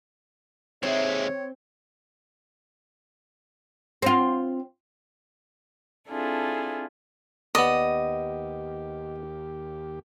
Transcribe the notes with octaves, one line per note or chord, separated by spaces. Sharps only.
D#2 G#3 C4 C#5 E5
C4 F4
C4 D4 E4 F4 G#4 A4
D#2 B3 G4 D5 D#5